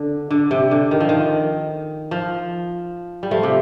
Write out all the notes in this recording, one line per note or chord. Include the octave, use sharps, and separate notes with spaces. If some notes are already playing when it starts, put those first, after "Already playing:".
Already playing: D3
D3
C3
D3
D#3
F3
D#3
F3
G3
F3 A3
C3